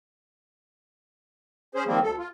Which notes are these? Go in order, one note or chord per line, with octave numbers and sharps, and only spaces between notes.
C#4 G#4 C5
D#3 F3 G3 A#3 C4
D2 A4
F4